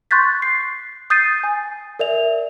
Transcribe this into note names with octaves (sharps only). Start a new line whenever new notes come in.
C6 C#6 F#6 G6 A6 B6
C7
D#6 G6 A6 C7 D#7
G#5
A#4 D5 E5 F7